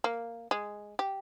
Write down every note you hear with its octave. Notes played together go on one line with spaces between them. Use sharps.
A#3
G#3
G4